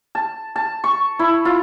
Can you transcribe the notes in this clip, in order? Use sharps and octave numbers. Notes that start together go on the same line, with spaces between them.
A5
A5
C#6
E4
F4